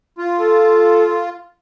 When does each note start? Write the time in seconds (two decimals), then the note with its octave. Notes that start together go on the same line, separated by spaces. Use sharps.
0.18 F4
0.39 A4